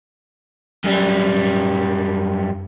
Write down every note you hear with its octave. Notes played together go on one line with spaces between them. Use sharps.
F#2 G3